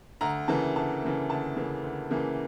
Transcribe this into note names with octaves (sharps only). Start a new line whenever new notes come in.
D2 A#5
C#3 E3 A#3 A5
D2 A5
C#3 E3 A#3
D2 A5
C#3 E3 A#3
D2
C#3 E3 A#3